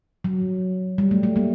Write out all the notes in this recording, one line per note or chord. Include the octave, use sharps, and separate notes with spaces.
F#3
G3
A3
A3
G3 A#3